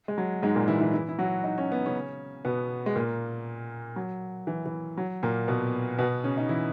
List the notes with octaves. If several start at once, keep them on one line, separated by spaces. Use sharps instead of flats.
G#3
F#3
G#2 G#3
A#2 A#3
E3 E4
E3 E4
E3 E4
E4
F#3 F#4
D#4
C#4
B3
C#3 C#4
B2 B3
G#3
A#2 A#3
F#3
E3
E3
F#3
A#2 A#3
B2 B3
B2 B3
C#3 C#4
D#4
E3 E4